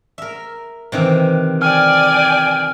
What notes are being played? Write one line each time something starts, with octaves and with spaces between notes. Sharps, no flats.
A#4 E5
C3 D#3 E3
D5 G5 G#5 F6